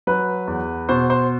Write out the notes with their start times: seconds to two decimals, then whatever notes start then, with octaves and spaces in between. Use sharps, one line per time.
0.07 F#3 B4
0.47 E2
0.89 B2 C5
1.10 C5